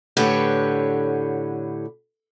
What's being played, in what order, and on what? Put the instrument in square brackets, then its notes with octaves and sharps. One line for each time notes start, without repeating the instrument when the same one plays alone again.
[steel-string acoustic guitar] A2 D3 G4 B4 C#5 F#5